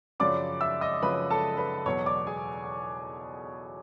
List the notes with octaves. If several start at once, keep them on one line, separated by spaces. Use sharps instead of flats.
F#2 C#3 F3 D5 D6
E5 E6
D#5 D#6
F#2 C#3 F3 B4 B5
A4 A5
B4 B5
E2 B2 F#3 B3 C#5 C#6
D5 D6
G#4 G#5